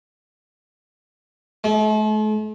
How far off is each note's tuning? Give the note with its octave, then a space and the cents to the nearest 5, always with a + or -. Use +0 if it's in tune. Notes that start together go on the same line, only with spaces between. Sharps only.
A3 -45